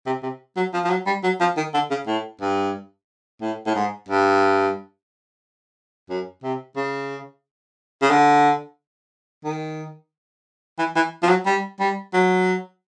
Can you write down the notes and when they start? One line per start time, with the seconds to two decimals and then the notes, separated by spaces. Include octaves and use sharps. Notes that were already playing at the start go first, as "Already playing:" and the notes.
0.06 C3
0.23 C3
0.56 F#3
0.74 F3
0.84 F3
0.90 F#3
1.06 G3
1.23 F#3
1.40 F3
1.57 D#3
1.74 D3
1.90 C#3
2.07 A2
2.41 G2
3.41 A2
3.66 A2
3.75 G#2
4.09 G2
6.09 F#2
6.43 C3
6.77 C#3
8.02 C#3
8.10 D3
9.44 D#3
10.79 E3
10.95 E3
11.23 F3
11.29 F#3
11.46 G3
11.80 G3
12.13 F#3